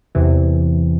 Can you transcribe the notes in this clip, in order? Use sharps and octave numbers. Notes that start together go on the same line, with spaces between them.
E2 C3 E3